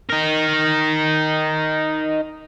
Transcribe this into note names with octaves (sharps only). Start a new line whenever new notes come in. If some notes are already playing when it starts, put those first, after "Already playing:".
D#4 A#4